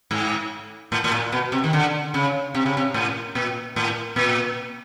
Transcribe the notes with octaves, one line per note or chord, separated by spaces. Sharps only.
G#2
A2
A2
A#2
B2
C3
D#3
D3
C#3
C3
C#3
C3
A2
A#2
A2
A#2